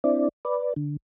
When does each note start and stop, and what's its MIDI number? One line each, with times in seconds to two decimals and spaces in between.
0.04 0.29 60
0.04 0.29 62
0.04 0.29 64
0.04 0.29 74
0.45 0.74 71
0.45 0.74 74
0.76 0.97 50